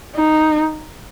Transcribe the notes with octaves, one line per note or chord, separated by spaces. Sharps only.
D#4